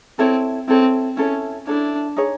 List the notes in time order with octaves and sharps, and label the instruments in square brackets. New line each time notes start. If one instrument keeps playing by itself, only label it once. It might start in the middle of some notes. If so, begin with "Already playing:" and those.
[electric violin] C4 [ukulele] E4 A4 C#5
[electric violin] C4 [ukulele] E4 A4 C#5
[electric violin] C#4 [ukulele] E4 A4 C#5
[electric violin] D4 [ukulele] E4 A4 C#5
[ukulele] D#4 G#4 C#5